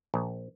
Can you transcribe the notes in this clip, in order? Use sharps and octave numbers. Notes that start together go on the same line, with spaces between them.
A#1